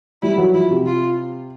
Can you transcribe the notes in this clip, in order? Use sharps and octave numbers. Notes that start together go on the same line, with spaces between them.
G3 E4
F#3
F3 E4
C3
F4